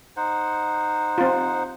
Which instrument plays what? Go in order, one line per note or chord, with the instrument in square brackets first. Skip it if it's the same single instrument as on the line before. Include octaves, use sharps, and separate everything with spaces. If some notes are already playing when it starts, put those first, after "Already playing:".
[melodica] D#4 C5 F#5
[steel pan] C4 F4